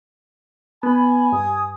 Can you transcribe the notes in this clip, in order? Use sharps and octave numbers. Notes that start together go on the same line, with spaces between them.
B3 G#5 B5
G2 D#6